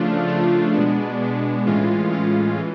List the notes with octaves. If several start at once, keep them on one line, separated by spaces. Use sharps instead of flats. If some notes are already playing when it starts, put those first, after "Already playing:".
Already playing: C#3 F3 A3 D4 F4
C#3 F3 A3 D4 F4
B2 G#3 B3 D4
B2 G#3 B3 D4
A2 E3 G#3 C#4 F4
A2 E3 G#3 C#4 F4
E3